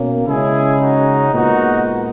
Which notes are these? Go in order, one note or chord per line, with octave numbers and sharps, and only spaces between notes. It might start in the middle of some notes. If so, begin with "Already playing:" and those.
Already playing: B2 A#3 C#4
C#3 G#3 C#4 E4 G#4
D#4 F#4
A#2 G#3 B3 D#4 F#4